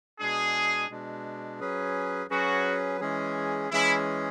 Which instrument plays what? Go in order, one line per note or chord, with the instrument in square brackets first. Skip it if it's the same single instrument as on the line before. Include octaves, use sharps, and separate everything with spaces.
[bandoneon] B2 G#3 D4 [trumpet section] G#4
[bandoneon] B2 G#3 D4
F#3 C#4 G#4 B4
[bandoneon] F#3 C#4 G#4 B4 [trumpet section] F#4
[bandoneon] E3 G#3 C#4 G#4
[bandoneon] E3 G#3 C#4 G#4 [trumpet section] E4